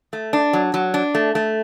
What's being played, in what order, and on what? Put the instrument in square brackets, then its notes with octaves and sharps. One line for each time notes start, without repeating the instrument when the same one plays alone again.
[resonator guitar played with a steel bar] A3
D4
F#3
F#3
D4
A3
A3